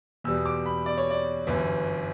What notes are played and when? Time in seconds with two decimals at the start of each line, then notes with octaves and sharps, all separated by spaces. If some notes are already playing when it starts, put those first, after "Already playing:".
0.24 E2 B2 G3 E6
0.45 D6
0.66 B5
0.86 D5
0.98 C#5
1.11 D5
1.47 G1 F#2 E3